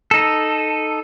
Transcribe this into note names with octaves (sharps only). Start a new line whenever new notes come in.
D#4 A4